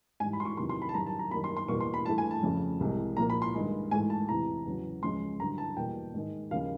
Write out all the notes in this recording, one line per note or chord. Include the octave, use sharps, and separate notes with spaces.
G#2 E3 G3 G#5
B5
C6
C#6
E2 C3 D#3 F#3 C6
C6
B5
A5
F#2 D#3 G3 A#5
A5
A#5
F#2 D#3 G3 A#3 B5
C6
C6
E2 B2 G3 A#3 C#6
C6
B5
G2 E3 A3 A5
G#5
A5
F2 C#3 F3 A3
C2 C3 E3 G#3
A#2 F3 A#3 A#5
B5
C6
G2 D#3 G#3
G#2 E3 A3 G#5
A5
E2 C3 E3 A#5
E2 C#3 F#3
C#2 C#3 F3 G#3 C6
G2 D3 F#3 A#5
A5
E2 B2 G3 A#3 G5
G#2 D#3 G#3
D#2 C#3 F3 F5